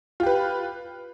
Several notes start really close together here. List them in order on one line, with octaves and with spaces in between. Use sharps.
F4 G4 B4